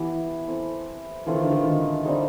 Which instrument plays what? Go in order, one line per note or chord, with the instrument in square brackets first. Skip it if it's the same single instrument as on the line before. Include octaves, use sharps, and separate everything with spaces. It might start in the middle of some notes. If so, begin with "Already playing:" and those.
Already playing: [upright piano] E3 [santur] B3 E4 G4
[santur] C4 E4 A4
[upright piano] E3 [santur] A3 C4 F4 A4
[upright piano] D#3
D3
D#3
D#3
[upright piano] D3 [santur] G3 C4 D#4